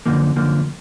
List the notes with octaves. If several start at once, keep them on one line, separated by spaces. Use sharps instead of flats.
F#2 D3 F3 A#3
F#2 D3 F3 A#3